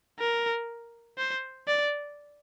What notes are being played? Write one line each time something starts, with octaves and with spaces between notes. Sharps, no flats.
A#4
C5
D5